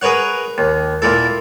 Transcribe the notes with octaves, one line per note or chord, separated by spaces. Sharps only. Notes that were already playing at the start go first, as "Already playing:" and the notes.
G#4 A#4 B4 C#5 F#5
D#2
A#2 A#3 E4 A4